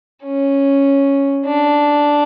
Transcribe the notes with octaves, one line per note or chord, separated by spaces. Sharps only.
C#4
D4